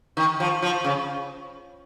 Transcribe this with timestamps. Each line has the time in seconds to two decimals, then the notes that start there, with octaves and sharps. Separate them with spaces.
0.17 D#3
0.40 F3
0.62 F3
0.84 C#3